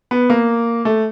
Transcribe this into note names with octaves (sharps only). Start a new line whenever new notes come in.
B3
A#3
A3